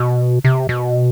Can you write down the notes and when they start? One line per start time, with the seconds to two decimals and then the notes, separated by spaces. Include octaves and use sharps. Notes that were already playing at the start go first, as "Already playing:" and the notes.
Already playing: B2
0.44 C3
0.69 B2